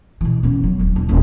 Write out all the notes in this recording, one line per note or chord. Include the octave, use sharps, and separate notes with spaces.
B2 E3
F#2 B3
F#3
E1 B2
E1
D#1